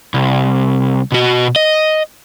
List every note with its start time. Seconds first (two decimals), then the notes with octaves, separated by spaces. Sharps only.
0.14 C2
1.12 B2 F#4
1.56 D#5